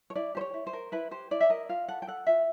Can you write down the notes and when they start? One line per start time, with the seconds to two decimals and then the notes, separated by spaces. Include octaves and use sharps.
0.10 C#5
0.15 E4 D5
0.35 G4 C5
0.41 C#5
0.54 E4
0.67 C5
0.73 A#4
0.92 E4 B4
1.11 G4 C5
1.31 E4 D5
1.40 E5
1.50 A#4 D#5
1.69 F4 F5
1.88 A4 F#5
2.02 G5
2.07 A4 F#5
2.27 F4 E5